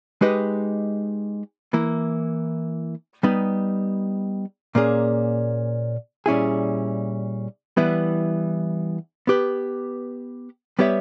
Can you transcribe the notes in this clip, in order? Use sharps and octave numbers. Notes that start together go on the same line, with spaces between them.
G#3 D#4 G4 B4 D#5
E3 A#3 E4
G3 B3 D#4
A#2 A#3 C#4 G#4
A#2 G3 C#4 E4 G#4
E3 G3 B3 E4
B3 G4 B4
G3 B3 G4 C#5 E5